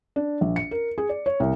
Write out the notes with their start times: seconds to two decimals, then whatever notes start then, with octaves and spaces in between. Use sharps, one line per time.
0.16 D4
0.41 A#1
0.56 C#7
0.71 A#4
0.98 G#4
1.09 D5
1.26 C#5
1.40 C2